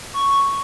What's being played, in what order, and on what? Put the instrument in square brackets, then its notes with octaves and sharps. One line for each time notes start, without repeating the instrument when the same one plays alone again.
[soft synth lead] C#6